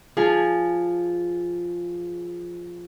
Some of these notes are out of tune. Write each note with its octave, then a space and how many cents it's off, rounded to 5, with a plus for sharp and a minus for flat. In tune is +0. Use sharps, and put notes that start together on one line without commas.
F3 +0 G#4 +0